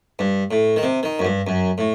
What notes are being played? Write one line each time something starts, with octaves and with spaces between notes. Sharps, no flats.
G2
A2
D#3
C3
D#3
F#2
G2
F#2
A2